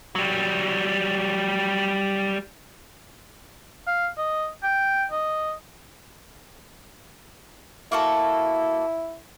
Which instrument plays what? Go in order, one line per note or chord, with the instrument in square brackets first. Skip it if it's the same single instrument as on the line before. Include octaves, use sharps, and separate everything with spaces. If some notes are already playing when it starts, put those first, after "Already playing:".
[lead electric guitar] F#3 G3
[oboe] F5
D#5
G5
D#5
[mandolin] A#3 F#4 A4 [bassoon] E4